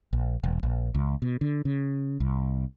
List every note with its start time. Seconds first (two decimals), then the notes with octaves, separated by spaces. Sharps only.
0.13 A#1
0.44 E1
0.63 A#1
0.95 C#2
1.22 B2
1.41 D3
1.65 C#3
2.20 C2